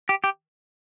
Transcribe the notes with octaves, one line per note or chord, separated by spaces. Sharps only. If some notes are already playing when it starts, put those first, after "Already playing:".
G4
G4